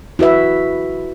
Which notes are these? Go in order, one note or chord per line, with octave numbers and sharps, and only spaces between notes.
E4 F#4 B4 E5